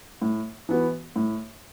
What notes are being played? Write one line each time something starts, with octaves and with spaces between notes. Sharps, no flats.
A2
E3 B3 F#4
A2